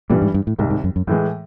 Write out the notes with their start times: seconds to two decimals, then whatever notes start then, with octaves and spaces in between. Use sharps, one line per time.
0.10 G2 A#2 E3 G3
0.22 G#2
0.34 G2
0.47 A2
0.59 C2 G#2 C3 D#3
0.70 G#2
0.84 F#2
0.96 F#2
1.07 F#2 A2 E3 G#3